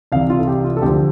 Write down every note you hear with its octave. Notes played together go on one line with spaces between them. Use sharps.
C2 C3 E3 F5
F4
A4
G4
F4
A4
D2 D3 F3 G4